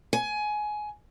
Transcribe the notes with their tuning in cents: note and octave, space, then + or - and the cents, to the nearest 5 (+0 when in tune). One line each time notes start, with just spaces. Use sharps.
G#5 +20